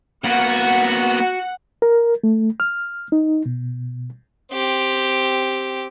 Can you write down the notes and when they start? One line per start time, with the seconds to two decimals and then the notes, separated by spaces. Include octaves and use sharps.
0.24 A#3 B3 F#4 F#5
1.82 A#4
2.24 A3
2.60 F6
3.12 D#4
3.46 B2
4.52 C4 G4